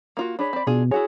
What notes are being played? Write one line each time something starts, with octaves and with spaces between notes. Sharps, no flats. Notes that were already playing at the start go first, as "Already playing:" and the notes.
A#3 F4 F#4
D4 G#4 C#5 B5
C4 D5
B2 D4 F4 G#4
E4 F#4 G#4 C#5